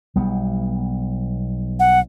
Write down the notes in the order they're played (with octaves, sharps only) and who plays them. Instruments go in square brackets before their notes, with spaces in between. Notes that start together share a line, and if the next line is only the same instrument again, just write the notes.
[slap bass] B1 G3 B3
[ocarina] F#5